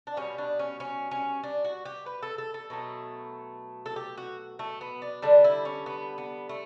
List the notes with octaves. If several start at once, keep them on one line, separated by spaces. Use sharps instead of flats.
D4
B2 G3 C#4
D4
C#4
C#4
C#4
D4
F#4
G4
B4
A4
A4
A4
B2 F#3 A3
A4
G4
F#4
A3
B3
D4
D3 G3 D4
E4
C#4
B3
B3
A3